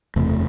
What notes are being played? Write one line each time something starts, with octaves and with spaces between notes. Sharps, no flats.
F#1 E2 C3 A3